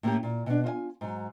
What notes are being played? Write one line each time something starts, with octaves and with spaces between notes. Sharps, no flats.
A2 A#3 C#4 G4
A#2
B2 D4
F4 D#5 G#5
G#2 F#3